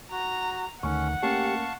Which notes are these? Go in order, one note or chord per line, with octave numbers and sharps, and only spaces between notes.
F#4 A#5
D2 D#3 A3 C#4 F#5 C#6
A3 A#3 C#4 G4 F5 A5 C#6